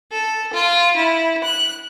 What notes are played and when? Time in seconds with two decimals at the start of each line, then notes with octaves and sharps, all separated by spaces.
0.12 A4
0.53 F4
0.96 E4
1.44 F#6